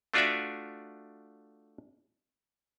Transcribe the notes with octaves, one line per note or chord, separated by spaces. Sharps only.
A3 D4 F4 F#4 D5 E5